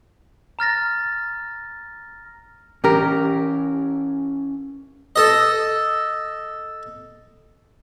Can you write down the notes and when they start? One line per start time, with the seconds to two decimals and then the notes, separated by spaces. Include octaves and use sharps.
0.59 A#5 F6 A6 A#6
2.84 E3 C#4 G4 A#4
5.16 A4 D#5